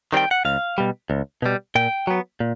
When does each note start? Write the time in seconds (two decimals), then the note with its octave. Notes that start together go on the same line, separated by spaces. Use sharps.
0.13 D#3 G3 C4 G5
0.31 F#5
0.45 C#2 F5
0.78 B2 G3
1.10 C#2
1.42 B2 G3
1.75 A#2 G5
2.07 F#3 B3
2.40 A#2